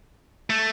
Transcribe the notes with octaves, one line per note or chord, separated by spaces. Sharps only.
A3